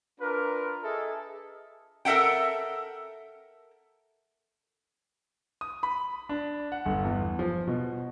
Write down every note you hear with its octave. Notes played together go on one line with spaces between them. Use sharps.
D4 F4 A#4 B4
G#4 A4 D#5 E5
A4 A#4 E5 F#5 G5
D#6
B5
D4
F#5
G1
E2
F3
B2